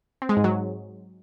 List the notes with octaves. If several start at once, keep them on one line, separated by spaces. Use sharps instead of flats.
C4
G#3
G#2
F#3